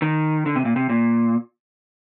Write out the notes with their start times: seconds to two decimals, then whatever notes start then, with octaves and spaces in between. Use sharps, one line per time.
0.02 D#3
0.46 D3
0.56 C3
0.65 A#2
0.76 C3
0.89 A#2